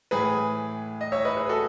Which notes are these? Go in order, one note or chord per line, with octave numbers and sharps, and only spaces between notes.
A2 E3 G#4 B4
D#5
C#5 E5
B4 D#5
G#4 B4
F#4 A4